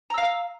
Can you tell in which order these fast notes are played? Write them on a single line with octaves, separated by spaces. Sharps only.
A#5 E6 F5